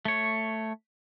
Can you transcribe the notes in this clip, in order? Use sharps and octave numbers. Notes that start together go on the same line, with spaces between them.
A3 C#5